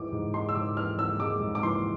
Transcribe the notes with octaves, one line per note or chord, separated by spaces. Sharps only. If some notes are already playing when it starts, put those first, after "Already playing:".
Already playing: G#2 E3 G#3 D6
G#2
G#3 C6
E6
G#2 D6
E3 F6
G#2 E6
G#3 D6
G#2
D6
E3 C6